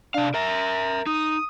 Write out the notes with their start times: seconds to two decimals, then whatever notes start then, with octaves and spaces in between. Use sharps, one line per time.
0.14 C3 D4 F5
0.34 A#4 E5 A#5
1.07 D#4 D#6